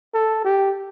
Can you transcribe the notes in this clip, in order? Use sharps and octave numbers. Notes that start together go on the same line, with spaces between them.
A4
G4